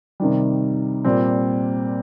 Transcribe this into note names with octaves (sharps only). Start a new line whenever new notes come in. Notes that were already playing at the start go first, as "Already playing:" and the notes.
C3 D#3 G3
A#2 G3 C4